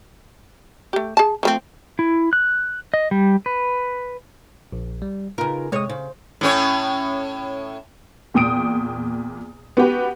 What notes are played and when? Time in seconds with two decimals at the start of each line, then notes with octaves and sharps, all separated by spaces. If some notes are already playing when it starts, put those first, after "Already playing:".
0.93 A3 G4
1.17 G#4 A5
1.43 F3 A3 C4
1.99 E4
2.33 F#6
2.94 D#5
3.11 G3
3.46 B4
4.72 A#1
5.02 G3
5.38 C#3 D#4 F4 A#4 B4
5.72 C3 G#3 C#5 D#6
5.90 C#3 C5
6.41 A2 C#4 C#5
8.34 E2 A#2 G5 D#6 D7
9.77 B3 F#4 G4 B4